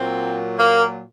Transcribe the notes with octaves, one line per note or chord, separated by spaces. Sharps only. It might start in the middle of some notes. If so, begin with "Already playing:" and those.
Already playing: A#2 F#3 C4
A#3